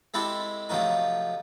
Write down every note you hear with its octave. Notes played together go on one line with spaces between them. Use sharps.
G#3 C4 E4 G4 A4
C3 F3 F#3 A3 D#4